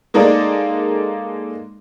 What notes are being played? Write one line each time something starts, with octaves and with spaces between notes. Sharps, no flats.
G#3 A#3 D#4 A4 D5